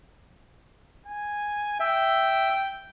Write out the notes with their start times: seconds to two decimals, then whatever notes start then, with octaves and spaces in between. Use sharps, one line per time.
1.06 G#5
1.80 E5 G5